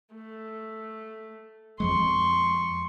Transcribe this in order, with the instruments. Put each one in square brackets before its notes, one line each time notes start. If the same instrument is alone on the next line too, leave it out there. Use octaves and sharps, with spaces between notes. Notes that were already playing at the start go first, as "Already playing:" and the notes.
[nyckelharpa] A3
[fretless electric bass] F2 F3 G#3 [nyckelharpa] C6 C#6